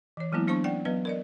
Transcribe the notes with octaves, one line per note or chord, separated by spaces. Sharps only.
E3 C#5
E3 F#3 G#3 A#3 B3 E4
F#3 B3 D4 C5 A5 C#6
C#4 D5 F#5 G5
F#3 B3 B4 D#5
A#4 D5 D#5